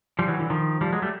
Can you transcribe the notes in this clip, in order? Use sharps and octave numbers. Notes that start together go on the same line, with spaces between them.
F3 G3
E3 F#3
D3 E3
D#3 F3
F3 G3
F#3 G#3
G3 A3